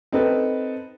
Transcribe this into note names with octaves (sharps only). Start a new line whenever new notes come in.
C4 D#4 A4 B4